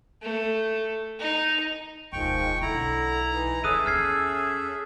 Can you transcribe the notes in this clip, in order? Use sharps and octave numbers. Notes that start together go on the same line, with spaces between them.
A3
D#4
E1 D2 D#3 F3 G#3 G5 C#6
B1 D3 E4 A#5
E3 D#4
D3 C#4 G#4 A4 E5 D#6 F#6 D#7
E2 F6 G#6 C7